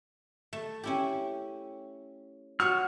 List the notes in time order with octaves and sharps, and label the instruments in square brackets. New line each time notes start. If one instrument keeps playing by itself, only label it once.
[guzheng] A3
C#4 E4 G4
[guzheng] F#4 C#5 F#5 [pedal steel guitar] F6